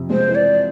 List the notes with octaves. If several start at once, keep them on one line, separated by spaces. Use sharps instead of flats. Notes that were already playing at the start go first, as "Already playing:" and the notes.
Already playing: F2 C3
G#3 C5
E3
D5